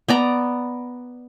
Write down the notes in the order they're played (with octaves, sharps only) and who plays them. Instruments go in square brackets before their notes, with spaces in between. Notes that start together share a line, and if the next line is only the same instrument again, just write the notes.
[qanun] B3 D5 A#5